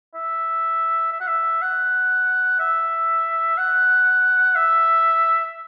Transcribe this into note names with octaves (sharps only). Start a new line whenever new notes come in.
E5
E5
F#5
E5
F#5
E5
F#5
E5